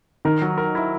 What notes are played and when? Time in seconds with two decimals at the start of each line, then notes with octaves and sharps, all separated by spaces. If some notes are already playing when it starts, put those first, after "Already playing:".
0.25 D#3 A#4
0.42 F#3
0.58 A#4
0.75 E4